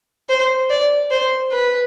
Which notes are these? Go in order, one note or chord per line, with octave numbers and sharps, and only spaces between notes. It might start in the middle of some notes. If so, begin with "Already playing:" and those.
C5
D5
C5
B4